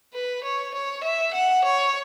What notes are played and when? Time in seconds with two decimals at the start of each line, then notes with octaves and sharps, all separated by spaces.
0.14 B4
0.44 C#5
0.74 C#5
1.04 E5
1.34 F#5
1.64 C#5